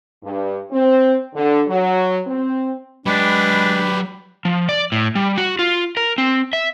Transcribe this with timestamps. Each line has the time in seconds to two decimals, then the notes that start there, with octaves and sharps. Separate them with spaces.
0.22 G2
0.70 C4
1.34 D3
1.68 F#3
2.26 C4
3.06 F#3 G#3 D4 G4 B4 D5 B5
4.45 F3
4.69 D5
4.92 A2
5.15 G3
5.37 F#4
5.59 F4
5.97 A#4
6.18 C4
6.53 E5